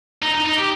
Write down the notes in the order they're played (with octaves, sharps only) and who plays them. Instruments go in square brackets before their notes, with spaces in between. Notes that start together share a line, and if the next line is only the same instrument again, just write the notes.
[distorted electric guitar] D#4
D#4
D#4
G4